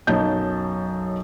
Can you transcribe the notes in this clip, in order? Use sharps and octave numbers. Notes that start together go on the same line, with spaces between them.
B1 F#2 F#3 D#5 A5 G6